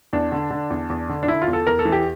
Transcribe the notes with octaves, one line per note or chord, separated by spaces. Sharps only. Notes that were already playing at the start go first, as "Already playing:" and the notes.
E2 D4
D3
D3
E2
E2
D3
D4
D3 E4
F4
E2
A4
E2 A#4
A4
E3
G4